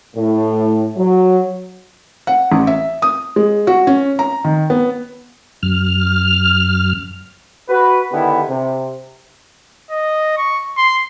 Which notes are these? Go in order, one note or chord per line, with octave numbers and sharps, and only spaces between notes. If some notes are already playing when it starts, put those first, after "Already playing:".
A2
F#3
F#5
A1
E5
D#6
G#3
F#4
C#4
A#5
D#3
B3
F#2 F6
F#4 B4
D3 D#3 B3 E4 G4
C3
D#5
C#6
C6